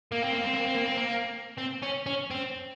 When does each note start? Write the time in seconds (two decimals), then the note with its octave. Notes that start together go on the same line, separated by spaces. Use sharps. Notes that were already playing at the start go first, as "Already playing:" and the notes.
0.12 A#3
0.23 C4
0.33 A#3
0.44 C4
0.54 A#3
0.65 C4
0.75 A#3
0.86 C4
0.97 A#3
1.58 C4
1.82 C#4
2.06 C#4
2.31 C4